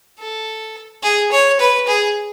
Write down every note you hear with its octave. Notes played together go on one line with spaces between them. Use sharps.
A4
G#4
C#5
B4
G#4